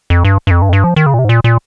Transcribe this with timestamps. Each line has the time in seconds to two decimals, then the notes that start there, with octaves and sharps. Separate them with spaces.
0.10 F2
0.25 G2
0.47 G2
0.51 F2
0.62 G2
0.69 F2
0.73 G2
0.84 F3
0.96 D#3
1.06 C#3
1.14 A#2
1.19 C3
1.24 G#2
1.29 A#2
1.44 A#2